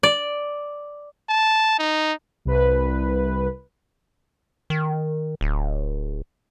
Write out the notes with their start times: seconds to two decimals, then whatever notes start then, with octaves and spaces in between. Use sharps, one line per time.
0.03 D5
1.29 A5
1.79 D#4
2.45 C2 B4
4.70 D#3
5.41 D1